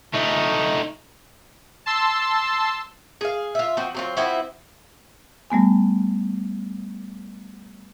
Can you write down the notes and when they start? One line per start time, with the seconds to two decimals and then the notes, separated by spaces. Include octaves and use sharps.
0.14 A3 D#4
1.86 A5 C6 E6
3.21 G#4 F5
3.55 F4 E5
3.77 F3 C4 F#4
3.94 F#3 C4 F4
4.17 F3 C4 E4 F#4
5.50 G3 A3 B3 G#5